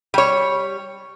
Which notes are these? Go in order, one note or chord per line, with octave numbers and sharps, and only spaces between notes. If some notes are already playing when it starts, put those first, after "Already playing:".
G3 C#5